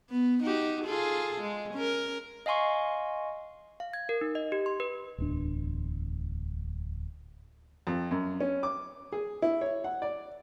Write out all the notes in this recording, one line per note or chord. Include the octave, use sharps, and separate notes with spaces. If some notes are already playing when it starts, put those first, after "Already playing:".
B3
D#4 F#4 G4
F4 G#4 A4
G#3
C#4 A#4
D#5 F5 G#5 C6 C#6
F5
G#6
A#4
D#4
D#5
G4
C6
B4
D1 E2 D4
F2
F#2
C#4
D6
G#4
E4
C#5
F#5
D5